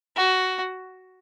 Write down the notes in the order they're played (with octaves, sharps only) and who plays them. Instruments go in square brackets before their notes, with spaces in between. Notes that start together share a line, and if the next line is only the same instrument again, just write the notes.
[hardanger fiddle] F#4